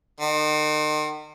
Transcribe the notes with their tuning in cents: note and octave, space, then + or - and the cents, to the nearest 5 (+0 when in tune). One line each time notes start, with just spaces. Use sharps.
D#3 -35